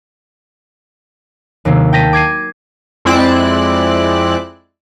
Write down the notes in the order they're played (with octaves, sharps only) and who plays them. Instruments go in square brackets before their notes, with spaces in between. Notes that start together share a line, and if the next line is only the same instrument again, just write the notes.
[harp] D#2 C3 D#3 F#3 A#3
G5 A5 A#6 B6 D#7
D6 G#6 C7 D#7
[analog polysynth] F2 G#3 C4 E4 D5 F#6